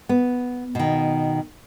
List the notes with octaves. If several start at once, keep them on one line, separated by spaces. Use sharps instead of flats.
B3
B2 D#3